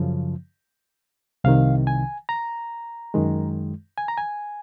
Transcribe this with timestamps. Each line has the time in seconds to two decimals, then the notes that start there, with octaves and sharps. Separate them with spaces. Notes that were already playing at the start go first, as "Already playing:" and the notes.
Already playing: F#2 C#3 F3
1.44 C2 C3 D#3 F5
1.87 G#5
2.29 A#5
3.14 F#2 D#3 G#3
3.98 G#5
4.08 A#5
4.18 G#5